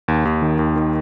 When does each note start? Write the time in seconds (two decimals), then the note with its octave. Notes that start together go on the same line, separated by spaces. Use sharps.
0.08 D#2
0.25 D#2
0.42 D#3
0.59 D#2
0.76 D#3